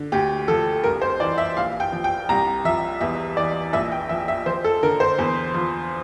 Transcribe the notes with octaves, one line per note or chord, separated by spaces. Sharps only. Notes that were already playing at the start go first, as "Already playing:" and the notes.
Already playing: D3
D2 G4
F3 A4
C2 A#4
C5
E3 D5
E5
A#1 F5
G5
F3
G5
C2 A#5
F3 E5
E2 E5
E3 D5
A#1 E5
G5
F3 E5
E5
F3 C5
A4
D3 A#4
C5
E2
F3